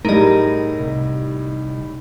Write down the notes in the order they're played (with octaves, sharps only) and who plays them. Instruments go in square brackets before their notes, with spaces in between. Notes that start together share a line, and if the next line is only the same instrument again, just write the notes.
[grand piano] A2 G3 [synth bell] D#4 D#5 [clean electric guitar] G#4 A#4
[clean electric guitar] C2